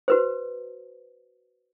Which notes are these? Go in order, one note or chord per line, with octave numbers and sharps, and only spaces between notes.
F#4 B4 C5